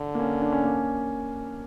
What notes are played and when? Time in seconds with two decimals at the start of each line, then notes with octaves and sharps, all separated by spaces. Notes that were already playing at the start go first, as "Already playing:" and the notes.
Already playing: D3
0.15 A#3
0.19 C#4
0.41 D4
0.52 C#4
0.64 A#3